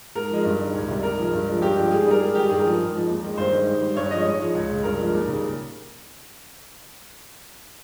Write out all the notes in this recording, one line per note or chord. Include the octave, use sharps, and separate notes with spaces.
G#2 A#4
F3 G#3
G2
D#3 G#3
C#2
C3 G3
G#2 A#4
F3 G#3
G2
F3 G#3
G2 G4
F3 G#3
G#2 G#4
G#4
G3 A#4
G#2 G#4
D#3 G3 G4
G2 G#4
A#4
F3 G#3
G#2
F3 G#3
D#2
D#3 G#3
G2 C5
D#3 G#3
G#2
G3
G2 C#5
F3 G#3 D#5
G#2 C#5
F3 G#3
C#2
C#3 G#3
G2 A#4
F3 G#3
D#2
C#3 G3